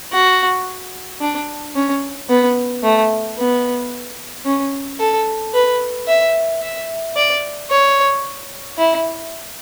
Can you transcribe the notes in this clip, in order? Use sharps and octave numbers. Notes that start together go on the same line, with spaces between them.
F#4
D4
C#4
B3
A3
B3
C#4
A4
B4
E5
E5
D5
C#5
E4